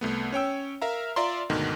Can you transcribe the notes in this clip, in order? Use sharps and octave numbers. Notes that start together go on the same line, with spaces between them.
C2 A3 B3
C#4 C#5 G5 E6
A#4 E5 F5 A#5
F4 D5 E5 F5 A#5 C6
D2 G#2 B2 D3 D#3